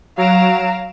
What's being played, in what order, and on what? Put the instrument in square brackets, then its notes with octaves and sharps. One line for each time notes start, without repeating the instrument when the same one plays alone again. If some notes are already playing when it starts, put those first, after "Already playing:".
[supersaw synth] F#3 D7 E7 [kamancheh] F5 A#5